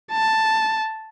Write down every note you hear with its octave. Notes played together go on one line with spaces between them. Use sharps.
A5